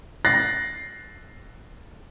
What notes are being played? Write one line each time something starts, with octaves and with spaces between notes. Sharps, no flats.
F#6 A6 A#6 C7